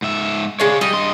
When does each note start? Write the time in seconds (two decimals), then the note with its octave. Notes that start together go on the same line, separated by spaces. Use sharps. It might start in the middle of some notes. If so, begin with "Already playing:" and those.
0.02 G#2 E5
0.60 G#3 D4 C#5 F5
0.81 G3 D#5
0.93 G2 C6